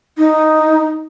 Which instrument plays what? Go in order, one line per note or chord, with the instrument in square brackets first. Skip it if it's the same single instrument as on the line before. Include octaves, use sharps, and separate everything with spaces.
[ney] D#4